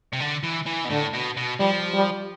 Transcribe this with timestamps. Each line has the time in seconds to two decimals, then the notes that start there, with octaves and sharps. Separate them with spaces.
0.13 C3
0.20 D3
0.43 E3
0.67 E3
0.85 B2
0.90 A2 D3
1.13 B2
1.37 B2
1.59 F3 G3
1.94 G3